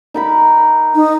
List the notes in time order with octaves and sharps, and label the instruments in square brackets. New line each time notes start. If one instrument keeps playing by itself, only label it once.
[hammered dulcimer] D#4 A#4 B5
[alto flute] D#4